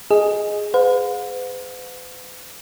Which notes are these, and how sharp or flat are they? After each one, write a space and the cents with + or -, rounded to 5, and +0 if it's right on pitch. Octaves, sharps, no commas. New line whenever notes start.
G#4 +0 D#5 +0
B4 +45 F5 +45